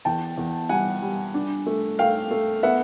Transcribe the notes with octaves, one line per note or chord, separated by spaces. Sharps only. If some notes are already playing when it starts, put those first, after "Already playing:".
E2 G5 A5
E2
G3 F#5 G#5
G3
D4
A3
A3 F5 G5
A3
B3 E5 F#5